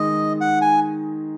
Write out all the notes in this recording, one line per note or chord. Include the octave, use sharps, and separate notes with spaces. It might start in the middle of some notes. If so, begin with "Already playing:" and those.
Already playing: D#3 G#3 D#4 D#5
F#5
G#5